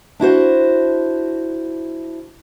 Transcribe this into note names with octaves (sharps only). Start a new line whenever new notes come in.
D4 E4 F#4 C5